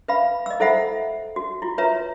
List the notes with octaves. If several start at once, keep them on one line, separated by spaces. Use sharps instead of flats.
B4 E5 F5 B5
D#5 E6
E4 A4 C5 E5 F#5 B5
F#4
E4 F4
B4 C#5 E5 A#5